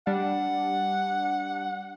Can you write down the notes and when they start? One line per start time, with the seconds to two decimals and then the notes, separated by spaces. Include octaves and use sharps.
0.07 G3 D4 F#5